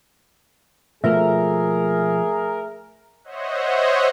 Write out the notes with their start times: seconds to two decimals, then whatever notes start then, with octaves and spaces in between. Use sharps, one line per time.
1.04 B2 F3 A3 A#3 G#4 A#4 E5
3.24 C5 C#5 D#5 E5 F#5